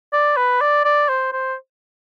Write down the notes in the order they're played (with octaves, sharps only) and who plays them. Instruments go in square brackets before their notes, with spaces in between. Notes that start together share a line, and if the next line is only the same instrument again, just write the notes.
[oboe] D5
B4
D5
D5
C5
C5